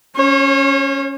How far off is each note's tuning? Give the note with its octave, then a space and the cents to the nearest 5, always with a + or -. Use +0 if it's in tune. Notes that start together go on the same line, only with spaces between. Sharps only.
C#4 +0 C#5 -40